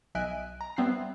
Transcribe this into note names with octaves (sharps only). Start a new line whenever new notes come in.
B1 D#5 E5 G#5 F#6 D7
A#5
G3 B3 C4 E5 F#6 C7